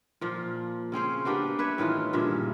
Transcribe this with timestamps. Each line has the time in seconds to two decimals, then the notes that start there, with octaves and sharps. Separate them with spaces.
0.21 A#2 F3
0.92 C#3 C4 C#4 C5
1.25 A#3 B3 D4 G4
1.59 B4 C#5 E5
1.78 A2 D#3 E3 F4
2.13 G2 A#2 C#3 E5